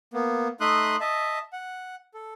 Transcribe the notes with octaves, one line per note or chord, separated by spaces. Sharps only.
A#3 B3
A3 D#4 E5 C6 D#6 F#6
D#5 E5 A5
F#5
A4